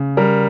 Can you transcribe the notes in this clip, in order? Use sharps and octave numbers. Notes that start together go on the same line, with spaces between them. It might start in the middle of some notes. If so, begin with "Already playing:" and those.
Already playing: C#3
G3 A#4